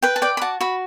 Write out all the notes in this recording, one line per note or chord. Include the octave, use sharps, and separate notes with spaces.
B4 G5
A5
D5 G5
B5
F#4 A5
F#4 B5